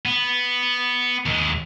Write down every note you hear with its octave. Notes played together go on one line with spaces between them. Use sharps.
B3
D#2 G#3